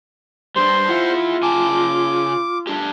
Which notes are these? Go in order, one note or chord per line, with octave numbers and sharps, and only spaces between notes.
G2 G3 C5 C6
E4 F4 E5 F#5
C#3 G#5 A5 D6
A3 D4 G4